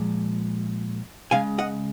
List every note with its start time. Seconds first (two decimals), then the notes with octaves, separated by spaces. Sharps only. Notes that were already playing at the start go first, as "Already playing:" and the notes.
Already playing: A#2 F3 G#3
1.31 C#3 G#3 F5 G#5
1.58 D#5 F#5